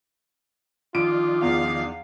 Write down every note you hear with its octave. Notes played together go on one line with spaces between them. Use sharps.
D#3 F3 D4 F4 D7
E2 F5